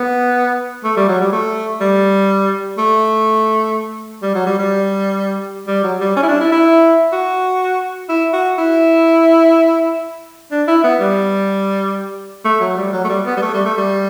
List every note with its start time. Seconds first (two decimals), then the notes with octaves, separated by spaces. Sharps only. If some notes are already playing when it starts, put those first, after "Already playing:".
Already playing: B3
0.84 A3
0.97 G3
1.08 F#3
1.20 G3
1.32 A3
1.81 G3
2.78 A3
4.22 G3
4.34 F#3
4.46 G3
4.59 G3
5.67 G3
5.83 F#3
6.00 G3
6.16 C#4
6.23 E4
6.28 D4
6.40 E4
6.52 E4
7.13 F#4
8.09 E4
8.33 F#4
8.58 E4
10.51 D4
10.68 E4
10.83 B3
11.00 G3
12.45 A3
12.60 F#3
12.76 G3
12.93 F#3
13.05 A3
13.09 G3
13.25 B3
13.37 G3
13.42 A3
13.54 G3
13.65 A3
13.77 G3